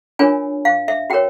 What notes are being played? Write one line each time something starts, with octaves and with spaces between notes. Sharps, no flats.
D4 F4 A#4 C#5 G#5
F5
E5
F#4 A#4 C#5 G5